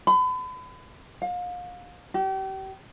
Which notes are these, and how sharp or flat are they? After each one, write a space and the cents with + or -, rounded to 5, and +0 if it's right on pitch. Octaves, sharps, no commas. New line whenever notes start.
B5 +40
F5 +35
G4 -35